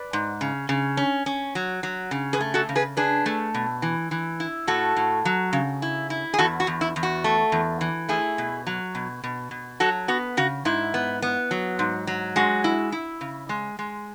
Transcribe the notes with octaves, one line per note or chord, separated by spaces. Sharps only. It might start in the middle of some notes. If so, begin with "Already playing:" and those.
Already playing: B4 D5
G#2
C#3
C#3
C#4
C#4
F#3
F#3
C#3
G#4 B4
A3
F#4 A4
C#3
G#4 B4
D4 G#4 B4
A3
B2
E3
E3
E4
A2 F#4 A4
A2
F#3
C#3
E4
E4
G#4
E2 F#4 A4
F#4
E2
E4
E2
F#4
A3
E2
E3
A3 E4 G#4
B2
F#3
B2
B2
B2
F#3 F#4 A4
B3 F#4
C#3 F#4
G#2 E4
B3
B3
F#3
G#2
F#3
G#3 F#4
E4
E4
C#3
G#3
G#3